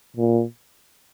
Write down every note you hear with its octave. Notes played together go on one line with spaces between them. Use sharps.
A#2